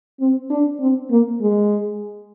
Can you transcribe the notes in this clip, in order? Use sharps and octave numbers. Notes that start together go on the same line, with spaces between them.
C4
D4
C4
A#3
G#3